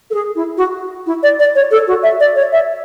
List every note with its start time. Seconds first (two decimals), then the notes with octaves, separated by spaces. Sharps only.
0.10 A4
0.14 G#4
0.35 E4
0.57 F#4
1.06 E4
1.23 D5
1.39 D5
1.55 C#5
1.71 A4
1.87 F#4
2.03 E5
2.20 D5
2.36 C#5
2.52 E5